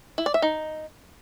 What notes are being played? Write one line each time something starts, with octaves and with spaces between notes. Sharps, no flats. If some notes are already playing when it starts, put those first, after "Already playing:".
E4
D5
E5
D#4